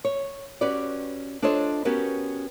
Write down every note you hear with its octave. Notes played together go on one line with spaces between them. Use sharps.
C#5
C#4 F#4 G4 B4 D5
D4 F4 A4 C5 C#5 D#5
B3 C#4 F#4 G4 A#4 B4